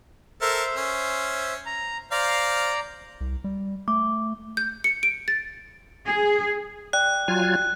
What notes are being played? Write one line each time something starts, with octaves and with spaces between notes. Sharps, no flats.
A4 A#4 C5 E5
C#4
A#5
C5 D5 F5 A#5
C2
G3
A3 D6
G6
C#7
D7
A6
G#4
D5 G5 F#6
F#3 F4 G#5